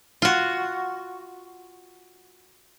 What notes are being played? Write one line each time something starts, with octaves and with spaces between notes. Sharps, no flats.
F4 F#4